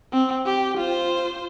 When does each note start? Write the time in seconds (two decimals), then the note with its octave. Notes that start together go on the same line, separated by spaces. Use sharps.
0.12 C4
0.46 G4
0.78 F4 C5